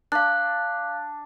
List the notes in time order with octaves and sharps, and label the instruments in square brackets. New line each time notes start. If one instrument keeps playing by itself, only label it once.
[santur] D4 [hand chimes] F5 F#6